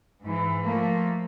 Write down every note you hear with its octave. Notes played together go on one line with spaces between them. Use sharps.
G#2 E3
F3 A3 A#3